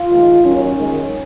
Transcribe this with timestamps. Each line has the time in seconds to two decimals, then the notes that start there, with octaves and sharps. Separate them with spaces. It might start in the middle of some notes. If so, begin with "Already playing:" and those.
Already playing: F4
0.11 D#2 D#3 G#3
0.44 D#2 D#3 F#3 C#4
0.77 F#2 D#3 G#3